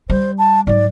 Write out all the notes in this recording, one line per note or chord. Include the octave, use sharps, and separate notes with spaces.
G3 C5
A5
G#2 F#3 D5